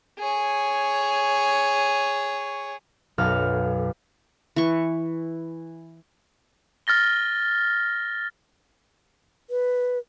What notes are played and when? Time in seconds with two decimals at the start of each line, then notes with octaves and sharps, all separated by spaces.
0.19 G#4 C#5
3.18 B1 F#2 F#4 A4 F5 F6
4.56 E3 C#6
6.87 F6 A6 A#6 G7
9.50 B4